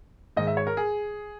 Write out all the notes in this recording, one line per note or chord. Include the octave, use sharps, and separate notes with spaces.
G#2 D#3 G#3 D#5
E5
C#5
A#4
G#4